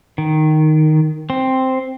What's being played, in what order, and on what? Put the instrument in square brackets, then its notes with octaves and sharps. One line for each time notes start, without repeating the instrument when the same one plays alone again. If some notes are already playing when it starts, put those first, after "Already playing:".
[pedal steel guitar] D#3
C4